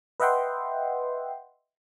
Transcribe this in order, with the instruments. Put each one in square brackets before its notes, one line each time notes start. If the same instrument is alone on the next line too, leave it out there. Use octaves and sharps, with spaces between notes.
[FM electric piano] B4 D#5 E5 F#5 G5 C6